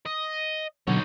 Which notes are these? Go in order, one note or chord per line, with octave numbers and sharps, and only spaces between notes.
D#5
B2 D3 F#3 D#4 C#5